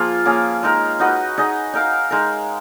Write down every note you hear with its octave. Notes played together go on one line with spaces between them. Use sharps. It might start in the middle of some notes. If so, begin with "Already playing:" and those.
Already playing: F3 A#3 F4 G#4
A#3 C#4 G#4
G#3 D#4 A#4
D#4 F#4 B4 D#5
D#4 G#4 D#5
D#4 A#4 F5
G#3 D#4 A#4